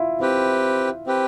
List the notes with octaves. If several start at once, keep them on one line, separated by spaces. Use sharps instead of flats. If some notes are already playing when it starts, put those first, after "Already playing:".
Already playing: E4 F4
C4 E4 G4 B4
C4 G4 B4